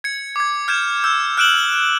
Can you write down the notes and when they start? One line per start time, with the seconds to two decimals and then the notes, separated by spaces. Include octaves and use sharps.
0.04 G#6 C#7
0.36 D6 G#6
0.68 F6 G6 G#6 E7
1.04 E6 G6
1.37 F6 F#6 D7 E7 F#7